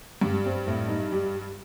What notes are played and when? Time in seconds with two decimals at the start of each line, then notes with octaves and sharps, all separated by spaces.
0.21 G2 G3
0.45 C4
0.67 A2
0.89 D#4
1.12 G3